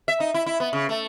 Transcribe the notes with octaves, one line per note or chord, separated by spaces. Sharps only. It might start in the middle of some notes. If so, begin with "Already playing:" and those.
E5
D#4
E4
E4
B3
C#3
A3